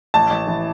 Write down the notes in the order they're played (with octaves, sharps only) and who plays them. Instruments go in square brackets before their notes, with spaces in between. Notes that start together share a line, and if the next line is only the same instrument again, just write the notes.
[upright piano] A1 A5
A1
E3